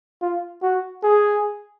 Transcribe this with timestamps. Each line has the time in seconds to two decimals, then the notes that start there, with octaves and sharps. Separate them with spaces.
0.22 F4
0.62 F#4
1.03 G#4